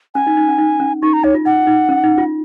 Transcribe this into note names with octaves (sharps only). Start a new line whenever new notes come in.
C#4 G#5
D#4
D#4
C#4
D#4
C#4
D#4 C#6
A#5
D#4 C#5
F4
D#4 F#5
D#4
C#4
D#4
F4